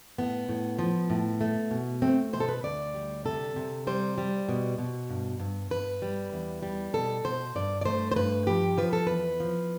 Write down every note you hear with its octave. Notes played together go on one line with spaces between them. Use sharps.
A2 B3
A2
F3
A2
A3
B2
A3 C4
B2 C5
A4
B4
D2 D5
G3
C3 A4
C3
G3 C5
G3
B2
B2
G2
G2
G2 B4
G3
E2
G3
B2 A4
B2 C5
G2 D5
D5
A3 C5
C5
G2 B4
F3 G4
F3 B4
A4
E2 B4
F3